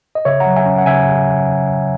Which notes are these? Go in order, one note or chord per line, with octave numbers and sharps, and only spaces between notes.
D#5
C#3 C#5 E5
F#5 A#5
F#3
E5 G#5
C#4
F#5
C#3 E5 G#5